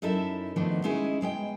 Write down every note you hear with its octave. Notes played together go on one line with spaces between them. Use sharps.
F#2 D#4 E4 A4 E5
B2 D#3 F3 A3 B3 D4
G#3 C#4 D#4 E4 G#4
B2 G#3 D5 G5